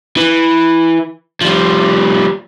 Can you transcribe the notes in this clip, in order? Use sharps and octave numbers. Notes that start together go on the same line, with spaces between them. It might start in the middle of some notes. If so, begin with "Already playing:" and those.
E3
F3 G3